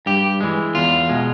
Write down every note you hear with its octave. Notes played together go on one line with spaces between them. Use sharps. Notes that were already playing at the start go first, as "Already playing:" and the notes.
G2 G4
E3 G#3
E2 F4
B2 G#3